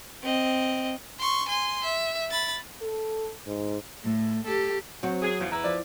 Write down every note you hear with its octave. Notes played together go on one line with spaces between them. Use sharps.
C4 D#5
C6 C#6
G#5 C6
E5
B5 A6
A4
G#2
A2 A3
G4 A4
F#3 C4 F#4
G#4
E2 C#3 F3
E4 B4 A#5
F3 D5